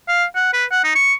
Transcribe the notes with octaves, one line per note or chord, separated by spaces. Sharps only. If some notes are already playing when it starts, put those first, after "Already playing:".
F5
F#5
B4
F#5
D#4
C#6